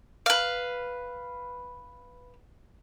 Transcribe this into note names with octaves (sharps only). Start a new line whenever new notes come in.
B4 F5